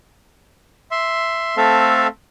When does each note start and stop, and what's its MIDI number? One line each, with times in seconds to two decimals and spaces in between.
0.91 1.57 76
0.91 1.57 84
1.57 2.07 57
1.57 2.07 60
1.57 2.07 69
1.57 2.07 76
1.57 2.07 77